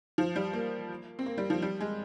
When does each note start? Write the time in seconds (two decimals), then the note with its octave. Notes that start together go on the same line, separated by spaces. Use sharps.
0.18 F3
0.36 G3
0.53 A#3
1.19 C4
1.26 A#3
1.38 G3
1.50 F3
1.62 G3
1.81 G#3